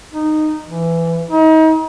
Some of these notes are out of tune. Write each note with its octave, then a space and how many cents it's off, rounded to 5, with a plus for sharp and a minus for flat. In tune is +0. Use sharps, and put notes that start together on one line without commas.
D#4 -15
E3 +15
D#4 +35